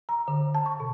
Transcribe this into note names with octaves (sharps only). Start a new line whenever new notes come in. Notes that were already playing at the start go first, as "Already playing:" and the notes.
A#5
D3
A5
C#6
B2